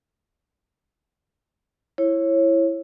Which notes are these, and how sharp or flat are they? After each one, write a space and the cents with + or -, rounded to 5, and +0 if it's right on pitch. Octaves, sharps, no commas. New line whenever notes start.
E4 +10 C#5 -25